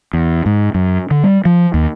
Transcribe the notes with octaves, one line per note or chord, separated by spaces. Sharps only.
E2
G#2
F#2
D3
G3
F3
D#2